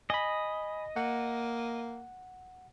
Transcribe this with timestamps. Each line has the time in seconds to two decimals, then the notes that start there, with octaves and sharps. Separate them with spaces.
0.10 D#5 G#5 B5
0.96 A#3 F#5